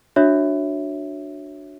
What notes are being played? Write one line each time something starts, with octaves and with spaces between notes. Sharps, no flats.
D4 F#4 C#5 E5